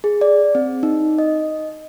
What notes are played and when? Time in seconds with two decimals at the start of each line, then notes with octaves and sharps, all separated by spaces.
0.04 G#4
0.21 D5
0.55 C4
0.83 D#4
1.18 D#5